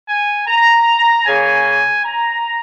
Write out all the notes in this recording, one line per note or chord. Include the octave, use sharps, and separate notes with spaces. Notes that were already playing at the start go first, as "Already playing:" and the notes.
G#5
A#5
C#3 A#3 G#5
A#5